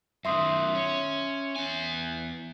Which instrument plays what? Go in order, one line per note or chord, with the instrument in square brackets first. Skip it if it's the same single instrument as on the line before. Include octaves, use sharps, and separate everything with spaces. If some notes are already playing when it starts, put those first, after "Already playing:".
[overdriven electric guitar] F#2 D#3 [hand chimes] E5 C6 D#6
[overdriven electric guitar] C#4
E2 G#5